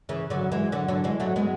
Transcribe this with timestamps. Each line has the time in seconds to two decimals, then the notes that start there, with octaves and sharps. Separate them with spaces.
0.09 C#3 E3
0.30 D3 F#3
0.52 E3 G#3
0.72 D3 F#3
0.88 D3 F#3
1.04 E3 G#3
1.20 F#3 A3
1.36 G#3 B3